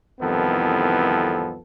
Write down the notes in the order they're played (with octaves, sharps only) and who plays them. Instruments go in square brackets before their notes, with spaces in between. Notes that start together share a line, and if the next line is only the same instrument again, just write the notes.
[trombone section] C2 F2 D#3 E3 B3 A4